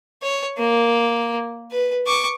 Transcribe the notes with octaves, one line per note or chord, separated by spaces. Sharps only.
C#5
A#3
B4
C#6 D6